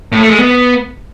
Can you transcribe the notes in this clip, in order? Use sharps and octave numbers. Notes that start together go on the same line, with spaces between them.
A2
A3
G#3
B3